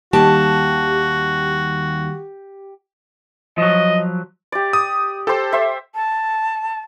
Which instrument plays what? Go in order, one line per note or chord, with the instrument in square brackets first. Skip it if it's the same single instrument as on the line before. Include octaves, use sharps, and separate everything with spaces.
[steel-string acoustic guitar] D#2 A5 [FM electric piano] D#3 G3 [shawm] F#4 [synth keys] G4
[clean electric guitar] F3 F#3 [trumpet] D#5
[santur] G4 D5
[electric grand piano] D#6
[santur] G4 C5 [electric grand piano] A4
[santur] C5 E5
[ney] A5